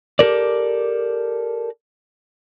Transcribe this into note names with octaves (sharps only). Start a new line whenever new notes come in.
G4 A4 A#4 D5